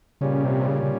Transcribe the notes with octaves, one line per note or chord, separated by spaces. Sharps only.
A#2 C#3 G3 C#4
C3
C#3
C#3